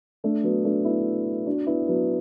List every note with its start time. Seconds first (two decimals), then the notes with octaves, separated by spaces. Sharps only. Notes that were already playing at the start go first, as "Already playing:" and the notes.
0.24 A3 D4
0.43 F#3 B3
0.64 A3 D4
0.85 B3 E4
1.47 D4 F#4
1.67 B3 E4
1.88 F#3 B3